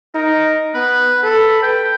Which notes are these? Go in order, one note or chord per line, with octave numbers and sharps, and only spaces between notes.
D#4 A#4
B3 B4
A4 B5
B4 G5